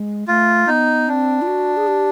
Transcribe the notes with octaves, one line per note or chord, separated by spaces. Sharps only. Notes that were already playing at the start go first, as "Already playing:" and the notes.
Already playing: G#3
A3 F4
B3 D#4
C4 D4
F4
F#4
G#4
G4